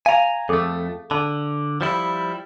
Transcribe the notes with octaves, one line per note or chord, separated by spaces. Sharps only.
F5 G#5 A#5
F2 A3 G#4 A4
D3 A5
F3 G3 E4